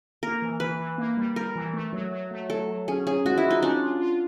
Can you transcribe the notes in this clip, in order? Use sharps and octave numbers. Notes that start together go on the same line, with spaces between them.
A#3 A#4
E3
E3 B4
E3
A#3
G3
G3 A#4
E3
A3
F#3
F#3
A3
F#3 A4
F#3
C#4 G#4
F#3 G#4
G#3 F#4
E4
F4
D#4
C#4 D4
F4
F4